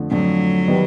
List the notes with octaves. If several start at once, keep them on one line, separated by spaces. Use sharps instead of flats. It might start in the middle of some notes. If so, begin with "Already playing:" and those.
Already playing: F2 D3 F3 A3
F2 D3 F3 F#3 A3
D#3 G3 B3